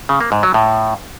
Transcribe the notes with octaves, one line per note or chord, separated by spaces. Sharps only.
C#3
A#3
G#2
F#3
A2